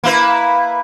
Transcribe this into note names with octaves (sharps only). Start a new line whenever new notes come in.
A#3 E4 B4